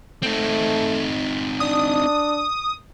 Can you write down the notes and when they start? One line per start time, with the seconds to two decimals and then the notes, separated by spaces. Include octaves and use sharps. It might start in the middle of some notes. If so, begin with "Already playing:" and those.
0.23 A3 C4 D#4
1.60 D4 D#6